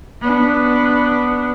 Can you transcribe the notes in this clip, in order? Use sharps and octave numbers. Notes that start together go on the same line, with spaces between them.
B3 D4